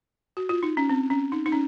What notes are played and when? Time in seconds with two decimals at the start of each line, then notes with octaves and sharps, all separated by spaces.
0.37 F#4
0.49 F4
0.63 D#4
0.77 C#4
0.89 C4
1.10 C#4
1.32 D#4
1.46 D#4
1.52 C#4